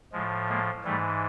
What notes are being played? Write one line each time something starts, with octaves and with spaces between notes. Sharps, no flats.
A2 F3 G#3
G#3 A#3
G#2 E3 G3 A3